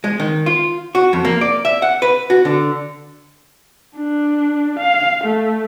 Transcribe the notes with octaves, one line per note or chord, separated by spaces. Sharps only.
G#3
D#3
F4
F#4
F2
A#3
D5
E5
F#5
B4
F#4
D3
D4
F5
A3